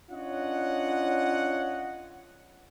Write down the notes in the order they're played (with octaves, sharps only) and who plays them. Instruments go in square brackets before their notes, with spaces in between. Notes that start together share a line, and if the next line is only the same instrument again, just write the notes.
[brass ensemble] C#4 D4 F4 C#5 D#5 F#5